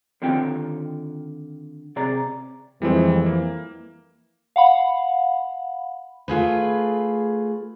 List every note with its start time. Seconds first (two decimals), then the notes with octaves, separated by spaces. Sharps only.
0.22 D3 D#3 C4 F4 G4 G5
1.96 C3 G#4 D5 A#5
2.82 F2 E3 G3 G#3 C4
3.26 A#3
4.56 F5 F#5 B5
6.28 A3 F4 G#4 B4